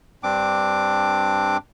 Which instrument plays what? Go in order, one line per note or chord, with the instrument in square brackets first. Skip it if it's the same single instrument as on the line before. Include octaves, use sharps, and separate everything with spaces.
[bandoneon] G2 C4 D4 D6